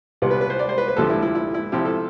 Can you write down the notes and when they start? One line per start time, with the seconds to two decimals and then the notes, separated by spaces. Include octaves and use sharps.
0.22 C2 C3 G3 B3
0.31 B4
0.41 B4
0.50 C5
0.59 D5
0.69 C5
0.78 B4
0.88 B4
0.97 D2 C3 F3 A3 A4
1.10 E4
1.22 E4
1.35 E4
1.54 E4
1.72 C3 F3 C4 E4 G4
1.85 A4